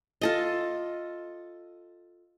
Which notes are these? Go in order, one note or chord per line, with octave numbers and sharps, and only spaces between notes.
F4 A4 D#5